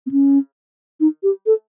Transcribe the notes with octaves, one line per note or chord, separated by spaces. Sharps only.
C4
C#4
D#4
G4
A4